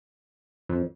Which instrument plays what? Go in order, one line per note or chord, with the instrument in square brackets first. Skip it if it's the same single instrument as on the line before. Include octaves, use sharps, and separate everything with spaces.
[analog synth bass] F2